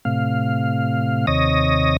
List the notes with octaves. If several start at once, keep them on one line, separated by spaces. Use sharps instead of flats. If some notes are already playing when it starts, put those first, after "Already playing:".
A2 C3 F5
D#2 C3 C#5 D#5 D#6 A#6